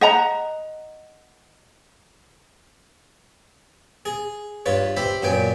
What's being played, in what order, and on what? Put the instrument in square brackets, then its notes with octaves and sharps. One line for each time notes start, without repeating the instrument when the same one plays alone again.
[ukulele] D#5 F#5 A#5
[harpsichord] G#4
G2 F4 B4 C#5
G4 C5 E5 B5
F#2 A#2 B3 G5 G#5